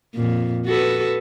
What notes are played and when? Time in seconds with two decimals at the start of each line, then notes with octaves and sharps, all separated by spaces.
0.15 F2 A#2
0.66 F#4 A4 B4